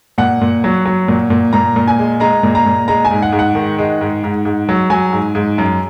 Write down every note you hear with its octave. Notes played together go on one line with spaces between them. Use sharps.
A#2 F#5
A#2
F#3
F#3
A#2
A#2
A#2 A#5
A#2
G#5
G#3
G#3 A#5
A#2
A#5
A#2
G#3 A#5
G#5
G#2
F#5
G#2
F#5
D#3
G#3
G#2
G#2
G#2
F#3
F#3 G#5
G#2
G#2
F#2